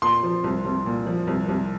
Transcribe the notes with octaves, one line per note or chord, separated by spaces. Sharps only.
A#2 C6
F3
C2
C2
A#2
F3
C2
C2